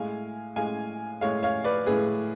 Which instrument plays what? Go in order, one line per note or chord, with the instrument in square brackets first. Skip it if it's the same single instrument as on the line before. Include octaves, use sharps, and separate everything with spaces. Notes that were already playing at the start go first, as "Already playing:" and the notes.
Already playing: [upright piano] A2 G#3 F5 G#5
A2 G#3 F5 G#5
A2 G#3 C#5 F5
C#5 F5
B4 D5
A2 G#3 G#4 B4